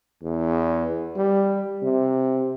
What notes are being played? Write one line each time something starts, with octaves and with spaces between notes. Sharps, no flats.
E2
G3
C3